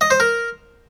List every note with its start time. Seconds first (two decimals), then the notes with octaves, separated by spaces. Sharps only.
0.01 D#5
0.11 C5
0.20 A#4